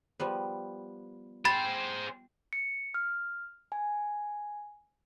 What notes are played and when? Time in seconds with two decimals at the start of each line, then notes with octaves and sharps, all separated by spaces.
0.20 F3 G3 B3
1.45 G#4 C5 G5 B5 A6
2.53 C#7
2.94 F6
3.72 G#5